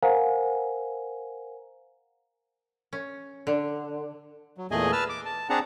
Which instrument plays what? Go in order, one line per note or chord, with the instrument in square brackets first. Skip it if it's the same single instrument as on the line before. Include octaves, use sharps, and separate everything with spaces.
[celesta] A#4 C5 F5 F#5 G#5 A#5
[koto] C#4
D3
[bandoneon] F#3
E2 A#2 A3 G#4 D#5 G#5
B4 A5 E6 F6
D6
A5
C4 D4 G#4 F#5 A5 A#5